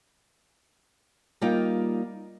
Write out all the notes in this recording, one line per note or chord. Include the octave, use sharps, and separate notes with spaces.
G3 A#3 D#4 F4 G5